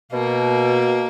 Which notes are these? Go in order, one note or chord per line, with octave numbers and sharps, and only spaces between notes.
B2 A#3